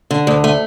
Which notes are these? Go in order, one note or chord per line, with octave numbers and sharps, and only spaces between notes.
D3
D2
A3